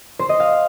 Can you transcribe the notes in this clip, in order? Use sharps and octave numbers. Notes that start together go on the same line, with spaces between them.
C5
D#5
F5